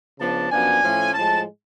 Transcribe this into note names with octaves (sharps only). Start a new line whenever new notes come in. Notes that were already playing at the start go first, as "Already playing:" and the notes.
C#3 F3 B3 D4 A5
F#2 F3 B3 D4 G#5
A2 F3 A3 C#4
A2 F3 G#3 A5